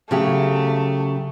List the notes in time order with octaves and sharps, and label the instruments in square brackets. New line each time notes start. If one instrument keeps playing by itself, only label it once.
[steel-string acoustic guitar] C#3 F#3 G4 [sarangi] A3